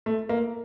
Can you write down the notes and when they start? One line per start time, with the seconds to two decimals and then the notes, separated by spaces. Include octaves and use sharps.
0.06 A3
0.29 A#3